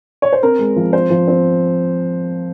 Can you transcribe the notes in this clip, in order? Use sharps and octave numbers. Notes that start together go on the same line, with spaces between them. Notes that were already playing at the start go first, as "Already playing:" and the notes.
C#5
C5
C4 A#4
G#3
F3
C4 C5
F3
C4